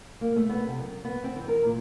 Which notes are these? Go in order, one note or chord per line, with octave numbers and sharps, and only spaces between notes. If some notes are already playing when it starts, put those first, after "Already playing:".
A#3
A3
B3
C3
F#2
B3
C4
E3
A#4
A#2